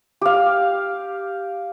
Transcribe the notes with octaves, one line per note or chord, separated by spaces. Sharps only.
G4 F5